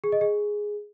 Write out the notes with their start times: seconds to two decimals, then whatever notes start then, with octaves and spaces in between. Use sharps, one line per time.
0.04 G#4
0.12 D#5
0.21 G#4